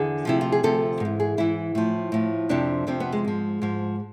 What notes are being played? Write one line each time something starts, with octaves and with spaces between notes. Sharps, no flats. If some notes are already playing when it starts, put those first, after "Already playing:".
Already playing: E2 D3 G#4
D2 C3 F3 E4
F4
G#4
D2 C3 F3 A4
G#2 E3
G#4
G#2 E3 E4
A2 F3
A2 F3
F2 C3 F3 D4
F2 C3 F3 C4
B3
G#3
G#2 F3
G#2 F3